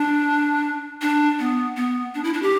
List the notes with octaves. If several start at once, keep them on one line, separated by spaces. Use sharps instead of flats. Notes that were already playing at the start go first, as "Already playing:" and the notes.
Already playing: D4
D4
B3
B3
D4
E4
D4
G4